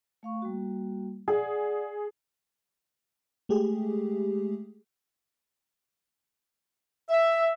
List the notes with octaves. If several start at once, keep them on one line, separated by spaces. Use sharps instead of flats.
A3 F5 C#6
G3 A#3 F#4
G#4 D5 F#5
G#3 A3 G4 G#4
E5